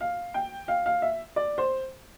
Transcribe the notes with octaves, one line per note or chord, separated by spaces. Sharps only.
F5
G5
F5
F5
E5
D5
C5